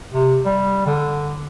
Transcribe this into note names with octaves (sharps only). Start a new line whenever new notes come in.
C3
G3
D3